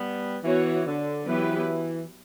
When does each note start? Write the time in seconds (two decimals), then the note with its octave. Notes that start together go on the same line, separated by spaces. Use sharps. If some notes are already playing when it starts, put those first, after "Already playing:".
Already playing: G3 B3
0.43 E3 B3 F#4 C#5
0.86 D3
1.27 E3 F#3 B3 E4 G4 B4